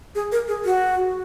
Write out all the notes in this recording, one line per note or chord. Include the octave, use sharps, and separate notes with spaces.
G#4
A#4
G#4
F#4